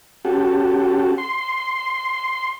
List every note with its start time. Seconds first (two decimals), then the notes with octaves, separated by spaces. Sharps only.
0.25 C#4 F#4 G4 A4
1.18 C6